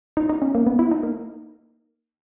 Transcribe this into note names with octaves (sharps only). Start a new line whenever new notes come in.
D#4
D#4
C#4
A#3
B3
E4
D#4
A#3